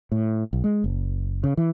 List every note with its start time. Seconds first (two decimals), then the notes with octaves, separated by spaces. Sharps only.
0.12 A2
0.53 B1
0.64 G#3
0.84 F#1
1.44 C#3
1.57 E3